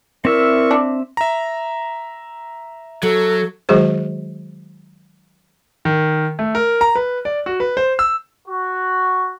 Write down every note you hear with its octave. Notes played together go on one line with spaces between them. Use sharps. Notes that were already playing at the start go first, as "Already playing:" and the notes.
C4 E4 A#4 D5 E5 C#6 E6
D4
E5 A#5
F#3 A4
D#3 F#3 G#3 F#4 G#4 C5
D#3
A3
A#4
A#5
B4
D5
F#4
B4
C5
E6
F#4